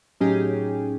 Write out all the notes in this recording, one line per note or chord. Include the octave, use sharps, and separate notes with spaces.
A2 F#3 C#4 D#4 G4 G#4